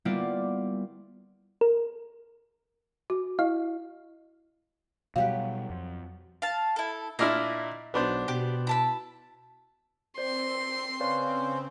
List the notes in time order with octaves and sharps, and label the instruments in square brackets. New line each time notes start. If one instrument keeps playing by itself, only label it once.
[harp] G3 A#3 B3 E4 F4 D5
[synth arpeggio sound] A#4
[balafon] F#4
[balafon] E4 D#5 [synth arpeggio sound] F5
[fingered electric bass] B2 G3 [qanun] F#3 G4 B4 [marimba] F5
[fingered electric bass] F2
[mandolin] F5 A5
E4 A4
[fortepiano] A#2 D4 E4 [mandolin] D#5 F6
[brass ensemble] B1 [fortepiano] B3 D4 C5
[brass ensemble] B2 [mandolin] G4
[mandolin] E4 A5 B5
[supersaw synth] C4 [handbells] C5 D5 [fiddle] C6
[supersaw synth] C#3 C4 [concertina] C#4 C5 [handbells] B4 D5 F5